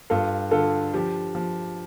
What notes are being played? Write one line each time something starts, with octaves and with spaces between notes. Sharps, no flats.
G2 F4 A4
D3 F4 A4
F3 G4
F3